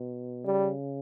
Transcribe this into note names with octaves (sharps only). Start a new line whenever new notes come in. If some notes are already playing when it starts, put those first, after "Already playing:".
Already playing: B2
C#3 G3